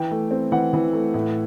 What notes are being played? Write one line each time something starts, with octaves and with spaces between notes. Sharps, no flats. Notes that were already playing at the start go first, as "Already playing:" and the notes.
Already playing: E3 G5
A3
C4
E3 F#5
E3
A3
A2